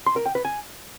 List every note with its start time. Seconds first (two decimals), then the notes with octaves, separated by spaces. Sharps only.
0.07 C6
0.16 A#4
0.26 G5
0.35 B4
0.45 G#5